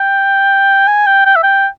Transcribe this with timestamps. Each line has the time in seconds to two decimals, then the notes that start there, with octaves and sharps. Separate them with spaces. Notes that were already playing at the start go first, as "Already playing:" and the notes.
Already playing: G5
0.88 G#5
1.07 G5
1.25 G5
1.36 E5
1.43 G5